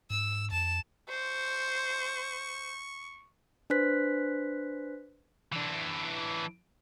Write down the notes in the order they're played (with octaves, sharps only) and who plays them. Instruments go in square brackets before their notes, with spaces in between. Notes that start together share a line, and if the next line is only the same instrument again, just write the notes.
[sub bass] G#2 [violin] E6
[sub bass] F2 [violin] A5 E7
[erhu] C5 [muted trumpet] C#6
[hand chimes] D4 B4 C5 F#6 B6
[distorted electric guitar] E3 D4